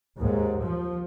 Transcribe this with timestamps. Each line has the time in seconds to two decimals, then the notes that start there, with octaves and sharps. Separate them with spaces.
0.18 D#2 G#2
0.63 F3